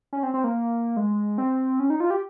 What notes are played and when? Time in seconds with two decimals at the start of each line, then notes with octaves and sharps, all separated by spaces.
0.13 C#4
0.23 C4
0.34 C4
0.44 A#3
0.97 G#3
1.38 C4
1.80 C#4
1.90 D#4
2.00 F4
2.10 G4